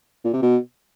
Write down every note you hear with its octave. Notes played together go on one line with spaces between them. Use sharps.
A#2
C3
B2